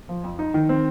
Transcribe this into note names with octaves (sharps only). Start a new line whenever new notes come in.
F3
F2
D#4
D#3
C4